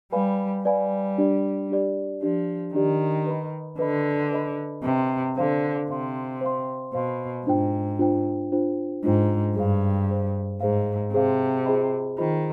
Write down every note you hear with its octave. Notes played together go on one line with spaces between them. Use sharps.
G3 B4 D5 F5 G#5 B5
G3 B4 D5 F5 G#5 B5
D4 G4 D5
D4 G4 D5
F3 D4 G4 D5
D#3 D4 G4 D5
B4 D#5 B5
D3 B4 D#5 B5
B4 D#5 B5
C3 B4 D#5 B5
D3 C5 F5 C6
C3 C5 F5 C6
C5 F5 C6
B2 C5 F5 C6
G#2 D4 F4 C5 G5
D4 F4 C5 G5
D4 F4 C5 G5
G#2 D4 F4 C5 G5
G2 G#4 C5 F5
G#4 C5 F5
G#2 G#4 C5 F5
C3 G#4 C5 F5
F4 G#4 C5 D#5 B5
D#3 F4 G#4 C5 D#5 B5